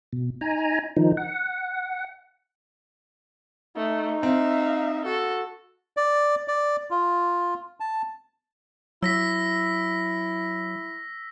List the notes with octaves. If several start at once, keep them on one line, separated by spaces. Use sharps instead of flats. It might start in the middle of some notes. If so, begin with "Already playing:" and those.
B2
D#4 G#5 A#5
D#3 F3 D#4
F#5
A3 D#4
C4 E5 F5
F#4 A4
D5
D5
F4
A5
F#3 E4 E6 A#6 B6